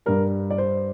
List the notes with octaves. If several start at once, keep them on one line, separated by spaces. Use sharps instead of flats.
G2 G3 A#4
D5
C5